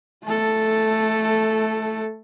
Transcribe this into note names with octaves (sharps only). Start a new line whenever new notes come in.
A3 A4